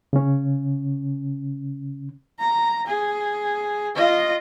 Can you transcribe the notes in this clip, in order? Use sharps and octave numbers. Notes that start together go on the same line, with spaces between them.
C#3 C#4
A#5
G#4
F4 D#5